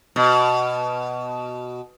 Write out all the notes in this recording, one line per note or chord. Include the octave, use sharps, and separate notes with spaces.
B2